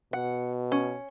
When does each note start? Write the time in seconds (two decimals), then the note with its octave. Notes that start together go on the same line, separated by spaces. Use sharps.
0.13 B2 F#5
0.72 C#4